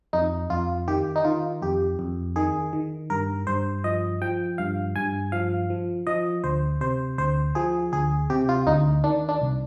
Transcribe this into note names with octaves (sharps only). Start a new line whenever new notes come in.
F2 D#4
F2 F4
D#3 G4
D#4
D#3 F4
F2 G4
F2
D#3 G#4
D#3
G2 A#4
G2 C5
F3 D#5
F3 G5
G2 F5
G2 G#5
F3 F5
F3
F3 D#5
D2 C5
C3 C5
D2 C5
F3 G#4
D2 G#4
C3 G4
F4
D2 D#4
D#3 D4
D4
C2